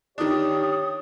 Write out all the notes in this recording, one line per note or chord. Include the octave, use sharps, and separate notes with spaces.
D#3 D4 G4 C#5 D#6